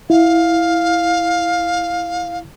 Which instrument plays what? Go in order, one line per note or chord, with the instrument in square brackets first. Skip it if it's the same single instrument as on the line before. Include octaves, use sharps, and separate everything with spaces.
[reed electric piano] E4 [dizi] F5